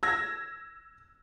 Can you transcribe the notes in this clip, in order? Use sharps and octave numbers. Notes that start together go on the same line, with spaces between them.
E6 G#6 A#6